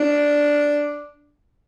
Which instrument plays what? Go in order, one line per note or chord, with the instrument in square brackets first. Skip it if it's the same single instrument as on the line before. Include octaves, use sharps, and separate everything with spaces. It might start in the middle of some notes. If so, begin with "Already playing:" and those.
Already playing: [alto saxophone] D4